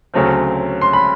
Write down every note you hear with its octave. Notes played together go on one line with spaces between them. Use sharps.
D2 C#3 F#3 A3 C4
C6
B5